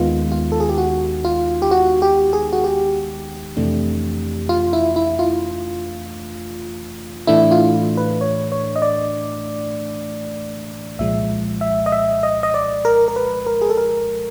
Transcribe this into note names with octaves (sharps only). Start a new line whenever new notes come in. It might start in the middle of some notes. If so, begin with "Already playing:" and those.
Already playing: D#2 D#3 G#3 B3 D#4 F4
F4
A4
G#4
G4
F#4
F4
G4
F#4
G4
G#4
F#4
G4
F2 C3 E3 A3 D4
F4
E4
E4
F4
A2 E3 A3 D4 E4
F4
B4
C#5
C#5
D#5
D5
C2 A#2 F3 G#3 E5
E5
D#5
E5
D#5
D#5
D5
A#4
A#4
B4
A#4
G#4
A4
A#4